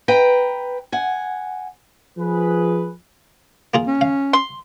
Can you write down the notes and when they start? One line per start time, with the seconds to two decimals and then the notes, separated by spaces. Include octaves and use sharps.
0.08 B4 G5 A#5
0.92 F#5 G#5
2.18 F3 G#4 B4
3.74 A#3 F4 G#4
3.87 C#4
4.01 F5
4.33 C6